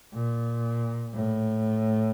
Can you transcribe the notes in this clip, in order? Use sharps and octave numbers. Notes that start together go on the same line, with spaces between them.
A#2
A2